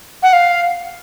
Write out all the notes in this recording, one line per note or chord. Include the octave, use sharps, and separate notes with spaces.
F#5
F5